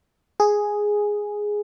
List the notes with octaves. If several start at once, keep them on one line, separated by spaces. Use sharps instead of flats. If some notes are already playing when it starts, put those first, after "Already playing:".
G#4